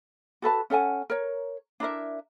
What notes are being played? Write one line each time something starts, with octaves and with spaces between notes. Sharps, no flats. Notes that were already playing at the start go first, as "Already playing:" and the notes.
F#4 A4 B4 A5
C#4 A4 F#5 G#5
A#4 C#5
D4 E4 A#4 E5